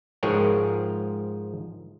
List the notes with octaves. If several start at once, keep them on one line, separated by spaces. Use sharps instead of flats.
G#2 F3 G#4 A#4 C#5 G5